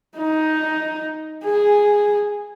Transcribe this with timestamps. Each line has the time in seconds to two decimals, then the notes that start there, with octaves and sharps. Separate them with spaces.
0.17 D#4
1.44 G#4